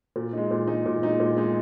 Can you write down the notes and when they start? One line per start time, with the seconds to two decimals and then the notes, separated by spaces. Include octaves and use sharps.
0.16 A#2
0.33 G#3 D#4
0.51 A#2
0.67 G#3 D#4
0.86 A#2
1.03 G#3 D#4
1.20 A#2
1.37 G#3 D#4